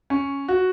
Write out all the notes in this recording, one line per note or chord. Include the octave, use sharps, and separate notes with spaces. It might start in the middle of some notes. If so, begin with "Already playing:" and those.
C#4
F#4